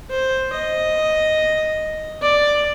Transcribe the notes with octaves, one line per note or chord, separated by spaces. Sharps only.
C5
D#5
D5